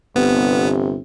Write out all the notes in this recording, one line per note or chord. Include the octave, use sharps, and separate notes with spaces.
G1 C3 B3